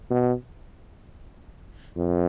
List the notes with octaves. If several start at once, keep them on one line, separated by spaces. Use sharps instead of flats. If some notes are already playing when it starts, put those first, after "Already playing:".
B2
F2